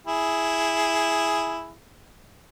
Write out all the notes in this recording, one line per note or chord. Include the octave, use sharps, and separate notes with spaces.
E4 G#4